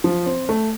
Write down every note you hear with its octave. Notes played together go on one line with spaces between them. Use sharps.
F3
C4
A3